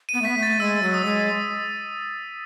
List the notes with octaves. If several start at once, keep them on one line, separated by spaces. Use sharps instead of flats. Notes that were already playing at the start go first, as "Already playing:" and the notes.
D#7
B3
A3
B6
B3
A3
A6
G#3 E6
F#3
D#6
G#3